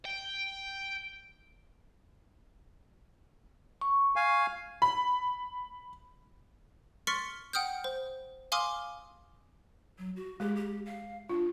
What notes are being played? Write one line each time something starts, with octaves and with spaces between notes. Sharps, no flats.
G5
C#6
F5 G#5
B5
C6 C#6 F6 A6 B6 C#7
F#5 G5 D#6 F6 G6
C5
F5 G#5 C6 D6 D#6 F6
F#3
F#4
G#3 G4 G#4
G4
F5
D4 F4